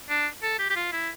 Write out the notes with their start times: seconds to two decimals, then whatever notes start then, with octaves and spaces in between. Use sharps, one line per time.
0.09 D4
0.43 A4
0.59 G4
0.70 G4
0.76 F4
0.92 E4